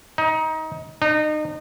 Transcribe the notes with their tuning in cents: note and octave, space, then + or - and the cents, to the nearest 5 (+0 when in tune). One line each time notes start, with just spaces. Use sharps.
D#4 +25
D#4 -30